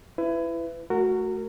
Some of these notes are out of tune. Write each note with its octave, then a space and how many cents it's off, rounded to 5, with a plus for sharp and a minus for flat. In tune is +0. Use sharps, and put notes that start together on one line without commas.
E4 +20 B4 +25
A3 -15 F#4 +0 A#4 -25